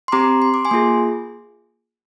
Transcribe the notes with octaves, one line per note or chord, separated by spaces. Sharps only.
C6
C4 G4 A#5 D6
C6
D6
G#5 C6
A#3 F4 G#4